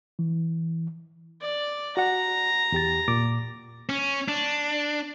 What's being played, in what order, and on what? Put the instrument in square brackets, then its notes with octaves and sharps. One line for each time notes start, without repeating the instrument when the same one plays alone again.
[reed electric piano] E3
[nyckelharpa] D5
[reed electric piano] F#4 F#5 [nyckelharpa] A#5
[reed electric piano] E2 G4 A6
A#2 D6 A6
[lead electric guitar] C#4
D4